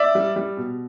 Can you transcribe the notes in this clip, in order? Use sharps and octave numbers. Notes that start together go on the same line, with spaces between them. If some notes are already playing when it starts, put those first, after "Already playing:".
Already playing: D5 E5
G3
G3
B2